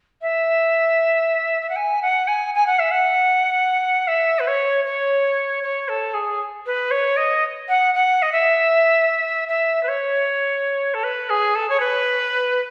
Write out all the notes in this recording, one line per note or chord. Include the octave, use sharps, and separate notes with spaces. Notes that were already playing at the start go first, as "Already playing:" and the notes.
E5
E5
F#5
G#5
F#5
G#5
G#5
F#5
E5
F#5
E5
B4
C#5
C#5
C#5
A4
G#4
B4
C#5
D#5
F#5
F#5
D#5
E5
E5
B4
C#5
A4
B4
G#4
A4
C#5
B4